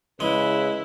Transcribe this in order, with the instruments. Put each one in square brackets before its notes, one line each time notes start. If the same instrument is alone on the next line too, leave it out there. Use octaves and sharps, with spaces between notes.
[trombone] C#3 [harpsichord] G#3 [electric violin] E4 [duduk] B4